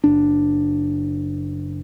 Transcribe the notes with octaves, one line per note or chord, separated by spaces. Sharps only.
F#1 D4